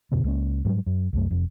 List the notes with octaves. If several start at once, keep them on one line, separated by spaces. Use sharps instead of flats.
F2 B2 D3 B3
C#2 G#3 A#3 C#4
G#2 F#3 G3
F#2
C2 F#2 A3
F1 F2